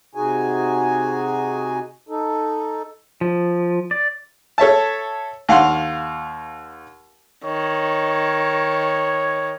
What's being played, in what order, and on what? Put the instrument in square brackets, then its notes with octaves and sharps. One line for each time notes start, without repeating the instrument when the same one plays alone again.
[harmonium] C3 D#4 F#4 G#4 G#5
D#4 A4
[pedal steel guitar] F3
D5
[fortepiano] A4 C#5 E5 A5
D#2 F5 F#5 C6
[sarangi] D#3 [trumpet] C#5